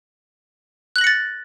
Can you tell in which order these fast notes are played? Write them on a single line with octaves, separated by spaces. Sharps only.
F#6 F#7 A#6 C#7 A6